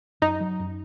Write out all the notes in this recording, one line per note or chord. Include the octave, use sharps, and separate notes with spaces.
F#2 D#4
F#3
F#2